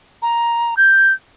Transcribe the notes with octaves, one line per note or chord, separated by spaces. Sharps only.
A#5
G6